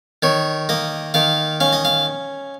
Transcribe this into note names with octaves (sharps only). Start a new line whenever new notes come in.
D#3 C#5
A#3 D#5
D#3 F5
C#4 F5
D#5
F5